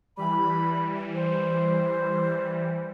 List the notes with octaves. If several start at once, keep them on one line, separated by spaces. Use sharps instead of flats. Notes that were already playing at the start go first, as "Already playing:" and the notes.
E3 G3 B5
C5